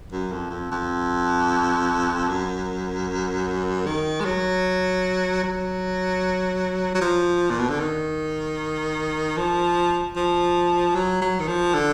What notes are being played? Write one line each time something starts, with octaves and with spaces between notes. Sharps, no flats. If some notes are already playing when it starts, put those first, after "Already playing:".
F#2
F2
F2
F2
F#2
D#3
G#3
F#3
F#3
F#3
F3
A#2
B2
D3
D#3
F3
F3
F#3
F#3
D#3
F3
D3